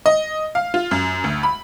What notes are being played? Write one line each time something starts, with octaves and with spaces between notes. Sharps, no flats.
D#5
F5
F4
F#2
D2
B5